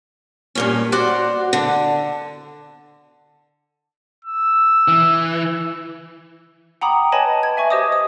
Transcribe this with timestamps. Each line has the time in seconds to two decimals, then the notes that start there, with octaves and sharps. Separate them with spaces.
0.55 G2 A#2 C#4
0.92 F#4 C5 D5 F#5
1.53 D3
4.25 E6
4.88 E3
6.81 F#5 G5 A#5 B5 D6 D#6
7.12 B4 C#5 D#5 G#5 A5 B5
7.43 G#6
7.57 E5 G#5 C#6
7.70 G4 C5 D#5 D6 D#6
7.92 D#6